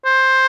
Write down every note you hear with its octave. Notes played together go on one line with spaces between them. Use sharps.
C5